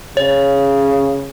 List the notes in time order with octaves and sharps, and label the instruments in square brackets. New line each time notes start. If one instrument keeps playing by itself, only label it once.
[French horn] C#3 [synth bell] C#5